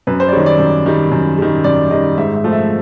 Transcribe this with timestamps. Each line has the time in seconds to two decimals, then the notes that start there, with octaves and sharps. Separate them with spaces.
0.07 F#2 B4
0.20 C5
0.28 D5
0.33 D#3 G3 C#5
0.46 D5
0.59 F#2
0.86 D#3 G3
1.11 F#2
1.38 D#3 G3
1.64 F#2 D5
1.91 D#3 G3 D#5
2.18 G#2 E5
2.34 E5
2.44 F3 A3
2.53 E5